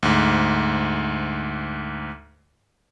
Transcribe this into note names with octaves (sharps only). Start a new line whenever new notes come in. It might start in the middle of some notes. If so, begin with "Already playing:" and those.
D2 G#2